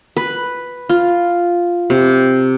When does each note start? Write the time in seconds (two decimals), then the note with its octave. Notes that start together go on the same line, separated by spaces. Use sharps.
0.17 B4
0.89 F4
1.90 C3